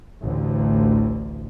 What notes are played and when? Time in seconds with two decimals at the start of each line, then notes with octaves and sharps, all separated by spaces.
0.23 A1 D2